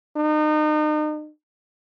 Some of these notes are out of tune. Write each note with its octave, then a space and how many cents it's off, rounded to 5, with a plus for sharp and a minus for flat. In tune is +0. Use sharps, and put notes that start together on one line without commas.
D#4 -35